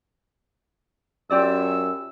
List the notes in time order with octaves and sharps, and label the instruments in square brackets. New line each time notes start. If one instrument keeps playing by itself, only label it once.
[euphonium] F#2 [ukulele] F4 G4 D5 [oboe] E6